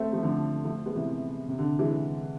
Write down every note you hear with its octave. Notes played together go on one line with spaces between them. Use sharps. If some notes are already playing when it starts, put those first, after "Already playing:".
Already playing: A3 C4
F3 A3
D3 F3
F3 A3
G#3 B3
C3 E3
C3
D3
E3 G#3